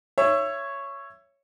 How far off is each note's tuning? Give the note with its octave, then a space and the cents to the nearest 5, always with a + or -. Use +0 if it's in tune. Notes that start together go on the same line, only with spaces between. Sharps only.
C#5 +0 E5 +25